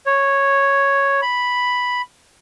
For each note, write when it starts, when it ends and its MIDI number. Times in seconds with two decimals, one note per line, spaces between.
0.06 1.21 73
1.22 2.02 83